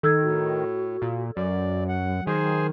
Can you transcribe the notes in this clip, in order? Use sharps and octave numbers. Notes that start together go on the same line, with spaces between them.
D#3 A4 E6 G#6
A2 F#4
A#2
F#2 F#3 D5
F#5
D#3 G#4 C5 G#5